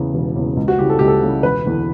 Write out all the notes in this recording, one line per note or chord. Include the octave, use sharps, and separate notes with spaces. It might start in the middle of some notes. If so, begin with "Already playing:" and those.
Already playing: E2 C#3
E1
E2 C#3
C#2
F#4
C#3 E3 G3 G4
A4
C#2 G4
A4
C#3 E3 G3
E1 B4
E2 D3